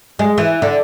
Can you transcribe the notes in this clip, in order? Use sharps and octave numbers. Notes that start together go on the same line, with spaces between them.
G#3
E3
D3